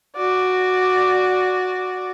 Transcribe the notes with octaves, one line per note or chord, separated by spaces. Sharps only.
F#4 D5